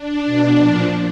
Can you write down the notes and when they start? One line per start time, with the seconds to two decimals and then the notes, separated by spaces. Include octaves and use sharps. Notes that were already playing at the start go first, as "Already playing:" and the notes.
Already playing: D4
0.25 B2
0.58 A#2 F3